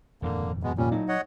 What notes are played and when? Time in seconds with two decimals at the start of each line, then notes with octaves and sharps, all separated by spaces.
0.22 D#1 F2 G#2 D3 A#3
0.63 B2 G#3 B3
0.78 A#2 G3 C#4
0.92 A2 F#3 D#4
1.08 C#5 D#5 F#5